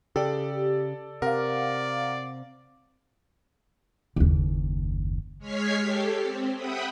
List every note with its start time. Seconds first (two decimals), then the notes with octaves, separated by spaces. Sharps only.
0.16 C#3 G4 A4 D5
1.22 C3 A#4 D5 F5 F#5
4.16 F#1 D#2
5.39 G#3 C#5 F6 G#6 B6 C7
5.79 G4 A4
6.21 C4
6.55 E5 F#5 G5 B5 D#6